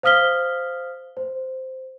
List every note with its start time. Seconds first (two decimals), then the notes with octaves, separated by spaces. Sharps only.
0.03 C5 F5 D#6 F6 B6 G7
1.17 C5